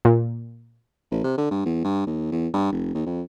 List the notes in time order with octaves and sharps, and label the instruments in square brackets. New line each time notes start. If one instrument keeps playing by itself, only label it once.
[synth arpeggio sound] A#2
[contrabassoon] A1
C3
D3
G2
E2
G2
D#2
E2
G2
F1
D#2
F2